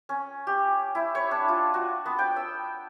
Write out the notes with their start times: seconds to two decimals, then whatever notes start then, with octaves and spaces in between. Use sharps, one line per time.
0.09 C#4
0.47 G4
0.95 E4
1.15 C#5
1.31 D4
1.48 F4
1.74 F#4
2.06 B3
2.19 G5
2.36 E6